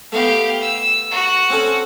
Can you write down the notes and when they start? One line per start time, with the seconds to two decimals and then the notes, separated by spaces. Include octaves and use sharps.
0.12 A3 B3 G4 F5
0.61 E6
1.11 F#4
1.50 C4 C#4 A4